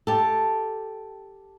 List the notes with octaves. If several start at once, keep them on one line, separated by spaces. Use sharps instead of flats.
G4 A4